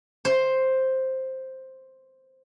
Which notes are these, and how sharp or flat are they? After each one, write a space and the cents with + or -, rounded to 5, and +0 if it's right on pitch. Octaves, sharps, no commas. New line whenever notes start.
C5 +5